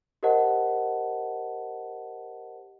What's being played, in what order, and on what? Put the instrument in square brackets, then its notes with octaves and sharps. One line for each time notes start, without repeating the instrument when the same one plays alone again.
[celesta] G4 A#4 C5 D#5 F#5 A5